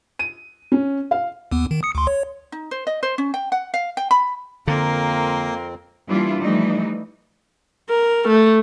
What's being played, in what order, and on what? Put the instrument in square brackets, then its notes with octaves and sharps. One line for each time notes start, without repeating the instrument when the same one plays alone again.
[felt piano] D#7
C#4
F5
[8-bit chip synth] D#2 B3
D#3
D#6 C#7
D2 C6
C#5
[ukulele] D#4
C5
D#5
C5
C#4
G5
F#5
F5
G5
B5
[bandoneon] F2 C4 [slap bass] D3 [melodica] A#3 [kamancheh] A#4 C6
[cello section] E3 G3 A#3 D4 E4 F4
E3 F3 G3 A3 D#4
[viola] A#4
A3